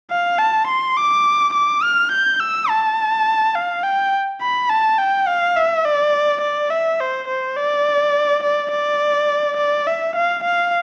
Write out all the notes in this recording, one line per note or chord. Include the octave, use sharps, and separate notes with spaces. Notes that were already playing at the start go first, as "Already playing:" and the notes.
F5
A5
C6
D6
D6
F6
G6
E6
A5
F5
G5
B5
A5
G5
F5
E5
D5
D5
E5
C5
C5
D5
D5
D5
D5
E5
F5
F5